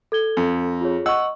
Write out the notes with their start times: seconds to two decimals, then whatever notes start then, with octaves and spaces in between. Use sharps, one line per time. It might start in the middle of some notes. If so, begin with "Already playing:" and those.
0.12 A4 G#6 G7
0.37 F2
0.81 F4 G#4 C#5
1.06 D#5 F#5 C#6 E6